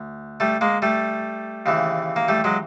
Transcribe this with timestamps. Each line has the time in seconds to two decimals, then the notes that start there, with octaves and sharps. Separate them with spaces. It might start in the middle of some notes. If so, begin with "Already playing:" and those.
Already playing: D2
0.40 G3 A3
0.61 G#3 A#3
0.82 G3 A3
1.66 D#2 C#3 E3
2.16 A#3
2.28 G3 A3
2.44 F#3 G#3